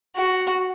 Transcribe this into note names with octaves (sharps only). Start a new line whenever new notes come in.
F#4